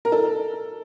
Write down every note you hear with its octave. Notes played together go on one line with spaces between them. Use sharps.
A#4
A4